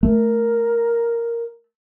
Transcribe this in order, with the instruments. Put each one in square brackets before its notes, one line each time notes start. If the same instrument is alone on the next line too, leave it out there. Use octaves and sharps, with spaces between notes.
[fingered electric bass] A3 [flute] A#4